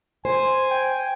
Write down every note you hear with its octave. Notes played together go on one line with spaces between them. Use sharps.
C5 G#5
G5